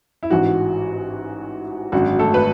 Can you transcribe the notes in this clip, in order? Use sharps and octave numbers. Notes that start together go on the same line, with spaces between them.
E4
A1 G#2 E3 F#4
G#1 F#2 D3 F#4
A3 A4
B4